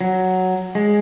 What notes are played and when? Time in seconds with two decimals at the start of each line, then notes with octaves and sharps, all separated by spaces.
0.01 F#3
0.75 G#3